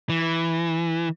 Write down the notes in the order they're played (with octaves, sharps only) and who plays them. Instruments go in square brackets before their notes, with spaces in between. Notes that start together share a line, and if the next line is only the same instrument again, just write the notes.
[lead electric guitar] E3